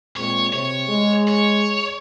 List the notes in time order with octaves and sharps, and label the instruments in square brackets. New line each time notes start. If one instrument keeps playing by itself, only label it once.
[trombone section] A#2 G#3 C4 [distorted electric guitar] C#5
[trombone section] C3 [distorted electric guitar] C#5
[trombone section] G#3
[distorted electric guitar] C#5